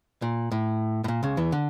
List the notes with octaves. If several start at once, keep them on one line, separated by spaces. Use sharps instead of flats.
A#2
A2
A2
A#2
C#2 C#3
E2 E3
D3